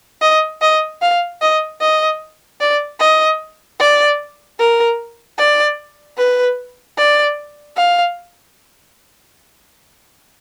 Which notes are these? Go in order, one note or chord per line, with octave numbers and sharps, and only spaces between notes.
D#5
D#5
F5
D#5
D#5
D5
D#5
D5
A#4
D5
B4
D5
F5